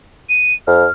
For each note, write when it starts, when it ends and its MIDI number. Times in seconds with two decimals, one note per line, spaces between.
0.29 0.53 99
0.67 0.86 41
0.67 0.92 89